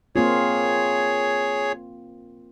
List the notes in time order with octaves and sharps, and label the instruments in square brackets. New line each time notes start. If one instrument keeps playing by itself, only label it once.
[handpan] A#3 C4 F4 [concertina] G#4 C#5